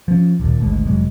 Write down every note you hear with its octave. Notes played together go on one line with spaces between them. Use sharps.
F3 C#4
D1 D#2 A#2
G#1 D2 A2 G#3
F1 F#3 G#3